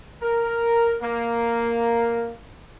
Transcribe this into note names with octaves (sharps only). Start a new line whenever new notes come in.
A#4
A#3